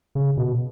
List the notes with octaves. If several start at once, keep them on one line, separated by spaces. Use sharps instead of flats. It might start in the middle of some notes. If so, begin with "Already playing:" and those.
C#3
B2